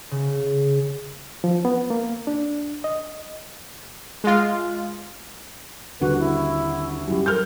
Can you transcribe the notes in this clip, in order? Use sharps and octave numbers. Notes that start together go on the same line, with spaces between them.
C#3
F3
B3
A#3
D4
D#5
G#3 F4
D#1 D3 F#4 B4
E4
F#2 G3 E4
A4 A#4 F6 G6